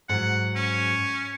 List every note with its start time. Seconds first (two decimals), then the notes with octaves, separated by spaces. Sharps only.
0.09 G#2 F#3 F#5
0.56 C#4